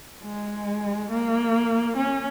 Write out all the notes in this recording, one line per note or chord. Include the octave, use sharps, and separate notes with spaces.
G#3
A#3
C#4